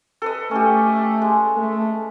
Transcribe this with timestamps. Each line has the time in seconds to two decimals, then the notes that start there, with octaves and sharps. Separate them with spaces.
0.22 A4 B4 D#5
0.51 A3 C#4 G4
1.22 G#3
1.57 A3